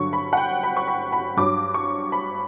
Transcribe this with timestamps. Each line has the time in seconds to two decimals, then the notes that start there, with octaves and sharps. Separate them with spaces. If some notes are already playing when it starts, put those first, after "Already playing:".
Already playing: G2 D3 F#3 C#6
0.13 B5
0.33 F#5
0.37 G5
0.63 B5
0.77 C#6
0.87 B5
1.12 B5
1.37 G2 F#3 D6
1.74 C#6
2.12 B5